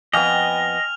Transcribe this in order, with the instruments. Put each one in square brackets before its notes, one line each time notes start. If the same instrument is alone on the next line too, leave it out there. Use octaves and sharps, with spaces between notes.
[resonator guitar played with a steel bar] F2 B3 [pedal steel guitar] D#5 [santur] G5 G#5 [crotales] F6 F7